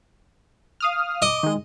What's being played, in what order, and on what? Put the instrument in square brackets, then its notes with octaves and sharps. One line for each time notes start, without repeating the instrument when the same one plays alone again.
[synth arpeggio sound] F5 D#6 F6
[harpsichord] D#5 [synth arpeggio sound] D6
[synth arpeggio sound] D#3 G#3